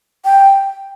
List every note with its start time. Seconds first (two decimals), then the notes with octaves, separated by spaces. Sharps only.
0.25 G5